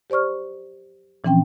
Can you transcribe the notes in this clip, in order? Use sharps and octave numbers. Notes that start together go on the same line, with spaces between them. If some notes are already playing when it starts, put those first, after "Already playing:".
G4 C5 D5 C#6 F6
A#2 E3 F3 C4 C#4 G5